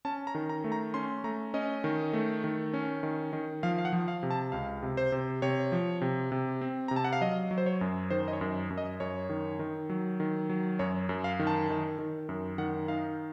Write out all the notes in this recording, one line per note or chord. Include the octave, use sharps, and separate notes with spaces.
C#4 A5
A#5
D#3
A#5
A3
A#5
C#4 C6
A3 A#5
C#4 D#5
D#3
A3
D#3
C#4
D#3
D#3
F3 F5
F5
F#5
F3
F5
C3
A5
C#2 F5
C3
C5
C3
C3 C#5
F3
C3
C3
C4
C3 A#5
A5
F#5
F5
F#3 D#5
F#3
C5
C#5
F#2
D#3 C5
D#5
C#5
F#2
F#2
D#5
F#2 C#5
D#3
D#3
F#3
D#3
F#3
F#2 C#5
F#2
F5
D#3
A5
D#3
D#3
F#2
D#3 F#5
D#4 F5